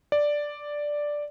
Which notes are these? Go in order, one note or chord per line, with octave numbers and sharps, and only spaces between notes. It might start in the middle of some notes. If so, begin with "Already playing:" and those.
D5